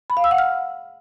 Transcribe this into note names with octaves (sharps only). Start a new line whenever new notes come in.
B5
F5
E6
F#5
F6